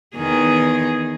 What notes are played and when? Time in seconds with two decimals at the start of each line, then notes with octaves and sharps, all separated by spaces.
0.16 E2 D#3 G#4